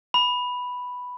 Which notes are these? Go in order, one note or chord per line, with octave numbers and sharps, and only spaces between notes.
B5